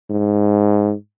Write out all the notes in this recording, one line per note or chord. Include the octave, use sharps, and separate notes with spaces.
G#2